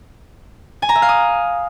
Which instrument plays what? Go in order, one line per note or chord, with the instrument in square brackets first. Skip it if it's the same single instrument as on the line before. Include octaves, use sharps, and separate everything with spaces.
[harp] G#5
A#5
E5
F5
D#6